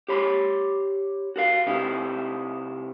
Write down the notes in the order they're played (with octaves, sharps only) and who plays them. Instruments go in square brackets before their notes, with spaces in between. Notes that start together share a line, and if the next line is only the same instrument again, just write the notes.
[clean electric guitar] G4 C#5 B5 C6
F#4 A#4 F5
C3 D#4 E4 G4